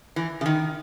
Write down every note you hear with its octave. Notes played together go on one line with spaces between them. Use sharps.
E3
C#3
D#3